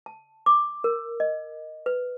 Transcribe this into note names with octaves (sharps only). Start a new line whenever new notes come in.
A5
D6
A#4
D#5
B4